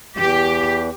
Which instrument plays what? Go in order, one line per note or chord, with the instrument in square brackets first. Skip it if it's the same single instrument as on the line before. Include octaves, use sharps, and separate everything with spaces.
[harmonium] E2 E3 [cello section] G4